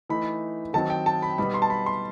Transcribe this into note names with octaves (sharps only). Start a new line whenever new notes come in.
E3 A3 D#4 B5
D#3 F#3 C4 D#4 A5
G5
A5
B5
B2 G3 B3 D#4 B5
C6
A5
B5
C6